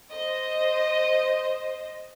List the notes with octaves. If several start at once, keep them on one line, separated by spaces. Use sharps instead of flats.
C5 D#5